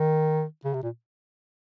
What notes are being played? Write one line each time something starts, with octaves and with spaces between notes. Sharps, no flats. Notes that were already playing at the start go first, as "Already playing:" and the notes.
Already playing: D#3
C#3
C3
A#2